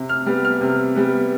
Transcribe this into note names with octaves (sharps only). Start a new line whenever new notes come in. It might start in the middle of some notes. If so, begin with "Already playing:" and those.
Already playing: C3
F6
G3 B3
F6
C3
G3 B3